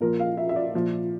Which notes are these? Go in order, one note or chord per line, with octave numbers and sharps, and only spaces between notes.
A#2 F3 A#4
F5
E5
E5
D5
A#2 F3